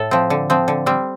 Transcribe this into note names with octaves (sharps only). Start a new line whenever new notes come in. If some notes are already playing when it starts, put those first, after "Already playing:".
Already playing: A2 A4
F3 C4
D3
F3 C4
D3
G3 C4